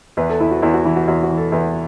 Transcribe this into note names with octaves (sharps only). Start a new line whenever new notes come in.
E2 B4
A4
E2 E4
F#4
E2 E4
F#4
E3 E4
F#4
E2 F#4
F#4
E3
A4
E2 B4